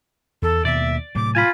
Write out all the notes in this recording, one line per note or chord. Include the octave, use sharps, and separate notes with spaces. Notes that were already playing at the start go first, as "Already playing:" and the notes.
E2 A4
D#2 B2 A#3 D5 E5
A2 C3 F#3 D6
F4 G#5 A5 B5